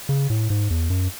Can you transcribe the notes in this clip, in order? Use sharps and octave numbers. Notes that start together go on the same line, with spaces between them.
C#3
A2
G#2
E2
F#2